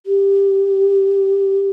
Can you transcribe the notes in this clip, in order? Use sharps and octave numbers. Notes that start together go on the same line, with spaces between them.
G4